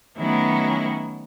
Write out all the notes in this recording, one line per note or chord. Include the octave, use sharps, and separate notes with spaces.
D#3 F#3 A3 B3 C#4 E4